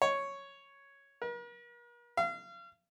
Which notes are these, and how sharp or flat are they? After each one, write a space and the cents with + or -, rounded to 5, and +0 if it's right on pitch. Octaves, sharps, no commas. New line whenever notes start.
C#5 +0
A#4 +45
F5 -35